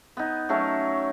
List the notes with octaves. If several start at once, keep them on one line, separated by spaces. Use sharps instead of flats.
B3 D#4
F#3 A3 C#4 A#4